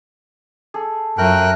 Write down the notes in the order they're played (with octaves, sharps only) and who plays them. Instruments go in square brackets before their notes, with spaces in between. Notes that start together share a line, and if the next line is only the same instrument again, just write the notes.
[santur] G#4 A4
[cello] F#2 [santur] A3 F4 [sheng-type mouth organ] A#4 G5 F#6